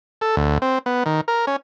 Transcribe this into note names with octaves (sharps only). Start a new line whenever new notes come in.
A4
D2
C4
B3
D#3
A#4
C#4